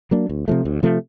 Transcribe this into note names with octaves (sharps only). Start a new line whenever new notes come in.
F#3 A#3 D4
D2
C3 F3 A3
D2
C3 F3 A3